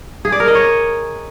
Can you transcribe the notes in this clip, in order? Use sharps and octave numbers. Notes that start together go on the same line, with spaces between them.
G#4
D5
A#4
D#5
C#5